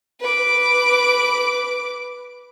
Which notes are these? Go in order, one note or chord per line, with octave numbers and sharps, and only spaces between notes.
B4 D6